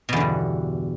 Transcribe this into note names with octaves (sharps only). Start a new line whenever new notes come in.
E2 G2 B2 D3